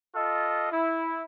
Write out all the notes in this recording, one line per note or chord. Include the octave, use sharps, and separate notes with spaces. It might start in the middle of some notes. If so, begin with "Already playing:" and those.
F4 A4 D#5
E4